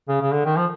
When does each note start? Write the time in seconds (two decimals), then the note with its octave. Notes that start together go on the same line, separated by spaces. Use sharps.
0.08 C#3
0.21 C#3
0.32 D3
0.45 D#3
0.57 F3